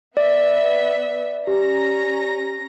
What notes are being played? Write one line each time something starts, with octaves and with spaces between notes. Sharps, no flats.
B3 B4 D5 E5
C#4 G4 A#5 A#6